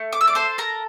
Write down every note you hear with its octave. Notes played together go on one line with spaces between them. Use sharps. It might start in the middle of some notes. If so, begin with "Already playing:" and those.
Already playing: A3
D6
E6
D5 D6
A4 C5 C6
A#4 A#5